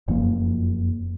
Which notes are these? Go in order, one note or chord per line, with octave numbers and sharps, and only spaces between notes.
F1 F#2 F3 A#3